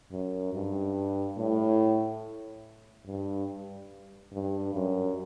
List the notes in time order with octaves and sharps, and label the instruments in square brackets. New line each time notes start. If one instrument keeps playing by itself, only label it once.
[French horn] F#2
G2
A2
G2
G2
F#2